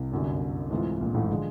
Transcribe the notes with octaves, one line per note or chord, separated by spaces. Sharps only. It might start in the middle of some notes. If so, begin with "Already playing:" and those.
Already playing: C2 C3
G1 F#2 D3 G3
G#2 E3 A3 C4 F4
A#1 A#2
A1 A2
G#2
D3 F3 G#3